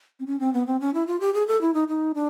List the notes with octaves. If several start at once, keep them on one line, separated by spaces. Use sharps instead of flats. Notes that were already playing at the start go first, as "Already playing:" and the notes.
C4
C#4
C4
B3
C4
C#4
E4
F4
G4
G#4
A4
E4
D#4
D#4
D4